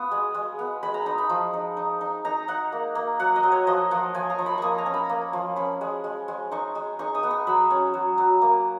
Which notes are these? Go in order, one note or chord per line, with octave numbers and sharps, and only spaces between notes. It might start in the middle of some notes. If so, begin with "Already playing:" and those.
Already playing: B3 F4 D#6
G#3
G#3
B3
G#3 B5
A#5
D#4 B5
B5
F3
D#4
D#4
D#4
D#4 A#5
D#4 F#5
A#3
A#3
F#3 F#5
D#5
F#3
C#5
F3 D#5
F3 F#5
F3 G#5
A#5
F3
B5
A#3 C#6 D#6
A#5
C#4
B5
A#3
F3
C#4 B5
G#3
G#3
G#3
D#4 C#6
G#3
D#4 C#6
D#6
B3
C#6
F#3 B5
C#4
F#3
F#3
A#3